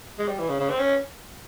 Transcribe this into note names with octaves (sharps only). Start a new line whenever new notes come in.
G#3
G3
E3
C#3
C#3
C4
C#4